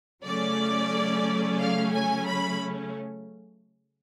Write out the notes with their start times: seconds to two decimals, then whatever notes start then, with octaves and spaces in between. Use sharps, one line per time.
0.24 C#3 F#3 A3 C#4 D5
1.60 F5
1.93 G#5
2.27 B5